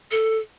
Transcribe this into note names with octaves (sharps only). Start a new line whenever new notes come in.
A4